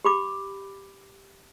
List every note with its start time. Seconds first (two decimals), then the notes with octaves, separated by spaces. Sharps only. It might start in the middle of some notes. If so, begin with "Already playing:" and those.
0.05 G4 B5 D6